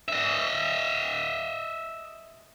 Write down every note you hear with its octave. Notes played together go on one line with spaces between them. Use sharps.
D#5 E5